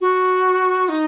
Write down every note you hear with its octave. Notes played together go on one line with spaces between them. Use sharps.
F#4
D#4